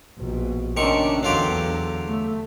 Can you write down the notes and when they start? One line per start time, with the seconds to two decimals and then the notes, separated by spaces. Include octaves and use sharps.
0.18 A#1 B2
0.77 C3 D#3 C#4 D4 C#6
1.23 E2 D3 F#3 F4 G4
2.08 A3